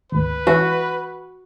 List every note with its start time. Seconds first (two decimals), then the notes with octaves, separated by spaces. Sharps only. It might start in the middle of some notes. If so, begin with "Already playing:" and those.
0.12 G#1 D2 B4
0.47 E3 C#4 F#4 E5